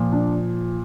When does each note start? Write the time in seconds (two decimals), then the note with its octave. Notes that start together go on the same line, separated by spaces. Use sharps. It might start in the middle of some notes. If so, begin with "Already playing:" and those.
Already playing: A#2 F3
0.12 D4